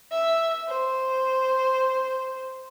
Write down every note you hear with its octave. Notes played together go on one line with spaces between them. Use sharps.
E5
C5